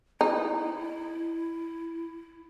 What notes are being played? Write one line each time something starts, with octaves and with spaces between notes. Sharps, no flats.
D#4 E4